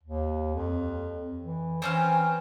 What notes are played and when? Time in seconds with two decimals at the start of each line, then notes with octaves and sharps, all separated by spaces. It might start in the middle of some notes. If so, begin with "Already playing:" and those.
0.03 D#2
0.55 F2
1.42 E3
1.82 E3 C4 C#4 F6